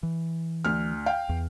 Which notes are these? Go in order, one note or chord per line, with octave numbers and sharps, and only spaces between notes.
E3
D2 F6
F5 G5
E2